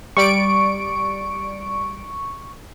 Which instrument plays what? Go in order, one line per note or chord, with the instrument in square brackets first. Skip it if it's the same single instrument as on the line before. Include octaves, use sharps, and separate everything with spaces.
[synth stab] G3 D5 D7 [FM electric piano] C#6